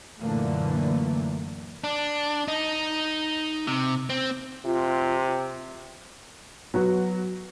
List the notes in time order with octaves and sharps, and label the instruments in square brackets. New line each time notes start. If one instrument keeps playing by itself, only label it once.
[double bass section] F#2 A#2 D3 E3 A3 A#3
[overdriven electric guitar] D4
D#4
C3
C4
[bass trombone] C3 [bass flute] F4
[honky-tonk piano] F#3 B3 F#4